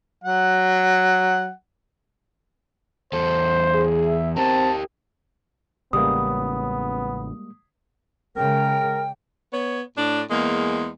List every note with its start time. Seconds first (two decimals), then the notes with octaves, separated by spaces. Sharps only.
0.24 F#3 F#5
3.13 E2 A4 C5
3.74 G#4
4.06 E5
4.37 C4 G4 A#4 A5
5.93 A1 C#3 G3 G#3 A#3 B3 D#6
8.37 C#3 G#3 A#4 G5
9.52 B3 C#5
9.96 A2 D4
10.30 E2 G#3 A#3